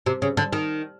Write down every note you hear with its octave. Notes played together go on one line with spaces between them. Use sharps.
C3
C#3
D3
D#3